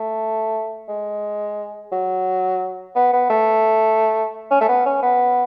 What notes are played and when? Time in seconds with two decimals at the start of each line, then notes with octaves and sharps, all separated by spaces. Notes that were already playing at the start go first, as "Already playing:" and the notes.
Already playing: A3
0.88 G#3
1.92 F#3
2.95 B3
3.13 B3
3.30 A3
4.51 C#4
4.61 A3
4.68 B3
4.86 C#4
5.03 B3